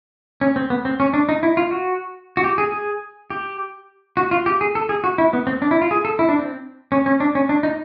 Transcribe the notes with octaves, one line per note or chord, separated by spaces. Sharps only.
C#4
C4
B3
C4
C#4
D4
D#4
E4
F4
F#4
F#4
G4
G#4
G#4
G4
F#4
F4
G4
G#4
A4
G#4
F#4
E4
B3
C4
D4
E4
F4
G#4
A4
E4
D4
C4
C#4
C#4
D4
C#4
D4
D#4